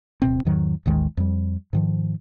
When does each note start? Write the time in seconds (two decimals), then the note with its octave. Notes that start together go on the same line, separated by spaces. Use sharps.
0.22 D1 B2 C4
0.45 E2 G#2 D#3 F#3
0.86 A1 D#2 D#3 G#3
1.17 F2 G3
1.73 G#2 D#3 F3